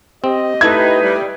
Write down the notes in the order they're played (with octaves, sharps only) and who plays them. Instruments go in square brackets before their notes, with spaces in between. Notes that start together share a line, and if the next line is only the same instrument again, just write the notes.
[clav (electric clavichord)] C4 [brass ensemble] G4 D#5
[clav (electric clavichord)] A3 E4 E5 [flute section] D#4 B4 [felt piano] G#6
[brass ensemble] G3